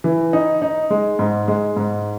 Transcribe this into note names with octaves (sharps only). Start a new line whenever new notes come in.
E3
D#4
D#4
G#3
G#2
G#3
G#2